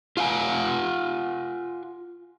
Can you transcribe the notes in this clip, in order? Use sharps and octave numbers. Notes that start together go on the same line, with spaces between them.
F4 F5 F#5 G#5